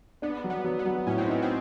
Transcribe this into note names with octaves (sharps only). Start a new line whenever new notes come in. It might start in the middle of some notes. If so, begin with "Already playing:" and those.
B3 D4
F#3
B3
F#3
B3
F#3
A2 C#4
C4
B3 D#4
C4